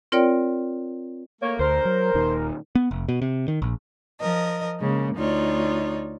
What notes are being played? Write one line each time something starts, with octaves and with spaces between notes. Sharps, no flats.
C4 F4 A#4 C#5 D5 G5
A3 A#3 C#5
D2 A#4 C5
F#3
D#1 D#2 D#3
B3
F1
B2
C3
D#3
A#1
F3 A#4 D#5
C#3 G#3 A#3
D2 D#4 F4 C#5 D5